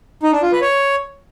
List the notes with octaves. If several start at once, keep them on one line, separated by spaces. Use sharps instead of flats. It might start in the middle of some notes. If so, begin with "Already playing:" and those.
D#4
D4
F4
B4
C#5